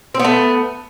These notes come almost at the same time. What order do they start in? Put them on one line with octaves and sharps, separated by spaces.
C4 B3 A3